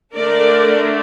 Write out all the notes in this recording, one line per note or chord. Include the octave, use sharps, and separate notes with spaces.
D3 A3 D4 A#4 D5